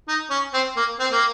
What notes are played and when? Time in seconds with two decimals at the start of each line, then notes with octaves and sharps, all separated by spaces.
0.09 D#4
0.30 C#4
0.54 C4
0.77 A#3
1.00 C4
1.12 A#3